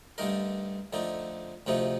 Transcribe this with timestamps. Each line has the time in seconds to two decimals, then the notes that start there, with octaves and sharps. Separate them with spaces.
0.18 G2 D3 A3 D#4 A#4
0.93 F2 D3 A3 D#4
1.67 D2 C3 F3 A3 D#4